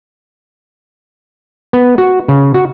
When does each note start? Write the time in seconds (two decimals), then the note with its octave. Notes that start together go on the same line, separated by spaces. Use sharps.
1.73 B3
1.98 F#4
2.28 C#3
2.54 F#4